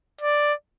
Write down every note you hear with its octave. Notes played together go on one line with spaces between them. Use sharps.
D5